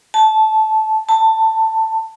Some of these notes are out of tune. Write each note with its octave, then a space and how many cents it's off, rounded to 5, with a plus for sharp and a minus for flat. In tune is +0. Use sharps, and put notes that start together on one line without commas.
A5 -15
A5 +15